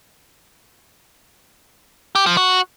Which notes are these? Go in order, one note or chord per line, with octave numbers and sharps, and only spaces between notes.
G4
F3
F#4